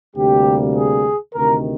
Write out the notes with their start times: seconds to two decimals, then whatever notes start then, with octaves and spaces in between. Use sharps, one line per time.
0.16 D2 C3 G3 A#3 G4
0.76 G#4
1.34 D2 C3 D#3 A#4